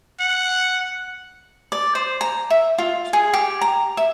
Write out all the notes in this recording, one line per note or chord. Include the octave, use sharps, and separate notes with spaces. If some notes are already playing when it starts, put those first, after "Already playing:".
F#5
D5
C5
A#5
E5
F4
G#4
G4
A#5
E5